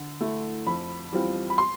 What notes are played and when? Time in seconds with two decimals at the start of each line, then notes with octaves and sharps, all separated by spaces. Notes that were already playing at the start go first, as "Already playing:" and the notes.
Already playing: D3
0.21 A3 E4
0.67 F2 B5
1.12 E3 G3 C4 F4
1.50 B5
1.58 C6